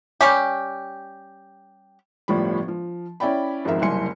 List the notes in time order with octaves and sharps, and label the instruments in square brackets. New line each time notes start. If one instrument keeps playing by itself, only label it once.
[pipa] G3 C#4 G4
[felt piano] G1 A2 F3 G3 B5
F3
C#4 E4 D5 G5 B5
G#1 F2 G#2 A#4 E5
F#1 C2 E4 G#5 C6 C#7